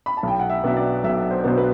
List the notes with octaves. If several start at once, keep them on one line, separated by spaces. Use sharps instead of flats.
B5
A5
B1 G5
F#5
E5
B2 F#3 B3 D4 E5
D5
B1 E5
C5
B2 F#3 B3 D4 C5
B4